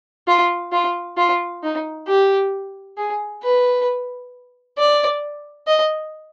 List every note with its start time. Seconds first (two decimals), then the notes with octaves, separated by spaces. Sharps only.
0.28 F4
0.72 F4
1.17 F4
1.63 D#4
2.08 G4
2.98 G#4
3.43 B4
4.78 D5
5.67 D#5